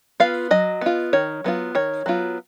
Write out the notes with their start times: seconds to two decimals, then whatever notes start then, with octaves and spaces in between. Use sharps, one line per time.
0.20 B3 F4 F5
0.51 F#3 D#5
0.81 B3 F4
1.13 D#3 C#5
1.44 F#3 B3 F4
1.75 D#3 C#5
2.06 F#3 B3 F4